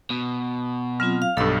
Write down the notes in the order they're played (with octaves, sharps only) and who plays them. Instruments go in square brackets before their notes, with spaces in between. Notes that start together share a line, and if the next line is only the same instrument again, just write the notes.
[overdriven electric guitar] B2
[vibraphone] F#3 C4 F4 [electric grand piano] F6
[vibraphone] F5
[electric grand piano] B1 G2 [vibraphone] A4 E6